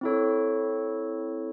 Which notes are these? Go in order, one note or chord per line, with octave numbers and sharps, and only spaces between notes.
C4 E4 A4 C#5